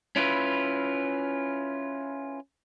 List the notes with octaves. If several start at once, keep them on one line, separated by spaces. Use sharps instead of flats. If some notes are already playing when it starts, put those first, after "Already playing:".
C#4 E4 F4 B4